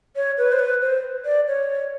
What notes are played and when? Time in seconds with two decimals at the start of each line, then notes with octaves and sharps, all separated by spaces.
0.16 C#5
0.38 B4
0.52 C5
0.59 B4
0.82 C5
1.25 D5
1.47 C#5